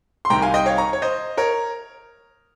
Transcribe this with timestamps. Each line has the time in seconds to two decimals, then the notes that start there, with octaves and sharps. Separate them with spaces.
0.25 C6
0.30 C2 C3 D#3 G5 A#5
0.42 F5 G#5
0.54 D#5 G5
0.66 C#5 F5
0.78 A#5 C#6
0.93 C#5
1.02 C5 D#5
1.37 A#4 C#5